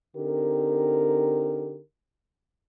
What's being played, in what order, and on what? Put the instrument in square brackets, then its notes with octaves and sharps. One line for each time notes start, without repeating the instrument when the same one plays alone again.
[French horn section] D3 C4 D#4 G4 A#4